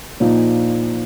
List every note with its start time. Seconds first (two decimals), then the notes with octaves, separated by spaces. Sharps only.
0.20 A#1 A#2 F3 D#4